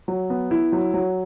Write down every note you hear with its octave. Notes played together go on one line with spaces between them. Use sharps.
F#3
B3
E4
F#3
F#3